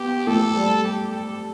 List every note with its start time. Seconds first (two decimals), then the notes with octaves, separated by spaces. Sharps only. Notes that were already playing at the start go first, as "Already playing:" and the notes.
Already playing: B3 G4
0.27 A3 A4
0.55 G3
0.84 G4
1.12 A4